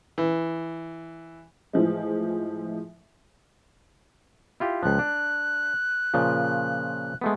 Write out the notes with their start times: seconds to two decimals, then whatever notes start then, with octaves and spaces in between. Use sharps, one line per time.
0.18 E3
1.73 A2 E3 F3 G#3
4.60 E4 F4 G4
4.83 C#2 F3 F#6
4.99 D4
6.14 A#2 C#3 F3
7.21 G#3 A3 B3